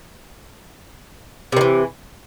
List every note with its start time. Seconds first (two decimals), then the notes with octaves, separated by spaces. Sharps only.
1.52 C3
1.57 D#3
1.61 E3